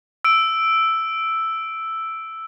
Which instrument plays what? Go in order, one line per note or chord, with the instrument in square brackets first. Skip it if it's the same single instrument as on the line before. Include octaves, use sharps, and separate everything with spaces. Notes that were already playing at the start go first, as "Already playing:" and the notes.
[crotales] E6 D7